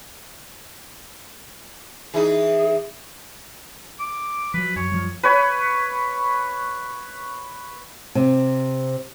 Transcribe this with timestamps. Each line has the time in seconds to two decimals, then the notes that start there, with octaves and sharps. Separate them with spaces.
2.14 E3 D#4 G#4
4.00 D6
4.54 F3 F#3 B4
4.76 F#2 C#5
4.92 F3 G3
5.23 B4 C#5 B5
8.15 C3